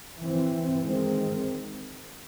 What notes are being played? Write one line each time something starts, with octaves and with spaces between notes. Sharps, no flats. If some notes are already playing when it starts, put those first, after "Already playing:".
E3 C4
D#3 G#3 C4